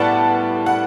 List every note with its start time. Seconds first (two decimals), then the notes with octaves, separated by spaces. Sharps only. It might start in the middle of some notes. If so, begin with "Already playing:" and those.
Already playing: A2 G3 B3 D5 F#5 A5
0.66 F#5